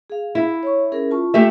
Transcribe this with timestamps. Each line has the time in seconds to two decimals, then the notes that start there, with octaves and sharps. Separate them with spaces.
0.10 G#4 F5
0.35 E4
0.63 C#5 C#6
0.92 C#4 G#4 A#4
1.11 F4 A5 C#6
1.34 A3 G4 E5